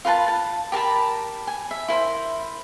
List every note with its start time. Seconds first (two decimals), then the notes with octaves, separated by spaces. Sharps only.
0.05 F4 A#4 B4 A5
0.28 A5
0.72 G4 A#4 A5 B5
1.47 G#5
1.71 E5
1.88 E4 A#4 C5